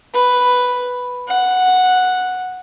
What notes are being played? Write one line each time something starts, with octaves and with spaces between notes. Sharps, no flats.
B4
F#5